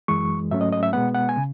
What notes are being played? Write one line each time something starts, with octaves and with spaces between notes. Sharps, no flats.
F#2 E3 G#3 C#6
G#2 F#3 A3 C#4 E5
D#5
D#5
E5
B2 G#3 B3 F#5
F#5
G#5
C#3